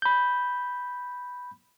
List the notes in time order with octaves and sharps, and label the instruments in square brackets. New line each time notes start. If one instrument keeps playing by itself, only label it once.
[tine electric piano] B5 G6